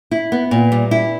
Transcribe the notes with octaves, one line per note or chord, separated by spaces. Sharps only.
E4
B3
A#2
G3
E4